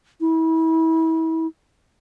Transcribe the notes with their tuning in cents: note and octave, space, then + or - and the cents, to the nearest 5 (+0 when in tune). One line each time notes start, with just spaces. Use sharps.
E4 -30